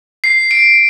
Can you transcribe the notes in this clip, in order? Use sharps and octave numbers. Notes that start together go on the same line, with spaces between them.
C7
D7